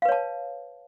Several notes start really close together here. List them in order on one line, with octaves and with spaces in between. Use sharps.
F5 B4 C#5 A5